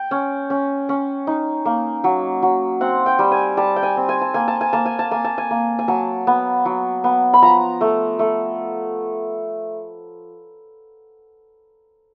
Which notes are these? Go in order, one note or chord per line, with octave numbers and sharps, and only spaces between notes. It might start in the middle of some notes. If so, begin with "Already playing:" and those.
Already playing: G5
C#4
C#4
C#4
D#4
A#3
F#3
F#3
C4 F#5
G5
G3
G#5
G3 A5
G5
G#5
C4
G#5
A5
A#3 G#5
A5
G#5
A#3 A5
G#5
A5
A#3 G#5
A5
G#5
A#3
G#5
F#3 A5
B3
F#3
B3
B5
F3 A#5
A3
A3